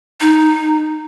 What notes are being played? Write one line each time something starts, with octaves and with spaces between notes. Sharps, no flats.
D#4